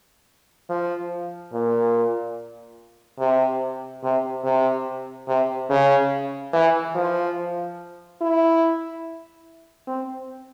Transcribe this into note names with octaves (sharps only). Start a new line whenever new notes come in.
F3
A#2
C3
C3
C3
C3
C#3
E3
F3
E4
C4